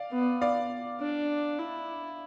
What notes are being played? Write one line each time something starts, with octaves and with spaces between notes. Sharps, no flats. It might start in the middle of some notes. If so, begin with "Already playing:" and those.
Already playing: D5 F5
B3
D5 F5
D4
E4